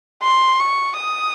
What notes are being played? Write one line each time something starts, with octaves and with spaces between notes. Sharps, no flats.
C6
C#6
D#6